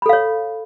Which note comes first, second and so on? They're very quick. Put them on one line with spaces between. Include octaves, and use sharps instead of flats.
B5 A4 F5 C#5